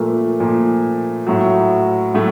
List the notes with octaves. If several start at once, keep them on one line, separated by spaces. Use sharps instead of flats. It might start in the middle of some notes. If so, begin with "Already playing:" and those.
Already playing: A#2 F3 A3 A#3
A#2 F3
A2 F#3
A2 F#3 A3